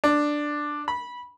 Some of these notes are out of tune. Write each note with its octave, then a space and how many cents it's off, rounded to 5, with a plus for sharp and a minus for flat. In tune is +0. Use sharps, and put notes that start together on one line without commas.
D4 +5
B5 -15